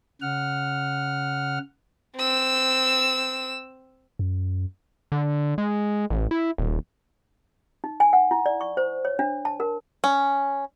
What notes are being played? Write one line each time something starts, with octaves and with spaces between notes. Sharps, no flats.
C#3 F#5 F6
C4 E6
F#2
D3
G#3
A1
E4
D#1
D#4
G#5
F#5
E4
D5
C#6
C5
C#5
D4
A5
A#4
C#4